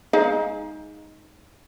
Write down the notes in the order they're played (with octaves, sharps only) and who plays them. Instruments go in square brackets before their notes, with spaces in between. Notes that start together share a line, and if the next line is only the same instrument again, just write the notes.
[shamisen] G#3 D#4 F5